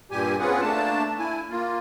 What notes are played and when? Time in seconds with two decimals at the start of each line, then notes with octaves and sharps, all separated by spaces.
0.11 G2 A#2 G3 G4 G#5
0.40 C4 C#4 F4 G#4 B4 F#5
0.61 A3 A#3 D4 A5
1.19 E4 G#5
1.50 A#3 F4